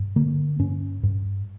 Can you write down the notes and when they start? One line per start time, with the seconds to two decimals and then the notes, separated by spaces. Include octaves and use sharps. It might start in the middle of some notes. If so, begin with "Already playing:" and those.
Already playing: G2
0.16 D3 A#3
0.59 G2 C#4
1.03 G2